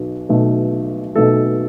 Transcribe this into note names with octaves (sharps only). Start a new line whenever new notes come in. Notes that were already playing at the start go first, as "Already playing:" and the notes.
Already playing: B1 B2
B1 B2 A3
B1 B2 A3 A4